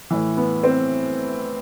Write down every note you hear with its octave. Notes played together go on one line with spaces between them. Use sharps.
A2 E3
B3
C4